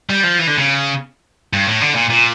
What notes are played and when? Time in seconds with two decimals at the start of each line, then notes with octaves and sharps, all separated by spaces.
0.10 G3
0.23 F3
0.39 E3
0.47 D3
0.57 C#3
1.53 G2
1.67 A2
1.81 D3
1.95 A#2
2.10 A#2